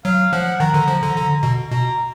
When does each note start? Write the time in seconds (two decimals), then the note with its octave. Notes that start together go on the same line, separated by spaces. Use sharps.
0.05 F#3 F5
0.33 F3 F#5
0.60 D#3 A#5
0.74 D3
0.88 F3
1.03 D3
1.16 D3
1.43 B2
1.71 B2 A#5